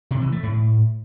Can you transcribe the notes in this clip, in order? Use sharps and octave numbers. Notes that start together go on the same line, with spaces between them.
C3
E3
A3
A2